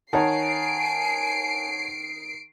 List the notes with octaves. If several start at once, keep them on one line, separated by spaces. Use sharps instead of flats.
D#3 C#5 F#5 G#5 A5 C7 D7